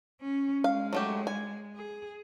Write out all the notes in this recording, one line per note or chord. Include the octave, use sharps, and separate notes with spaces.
C#4
G#3 F5
F#3 A3 G4
G#5
G#4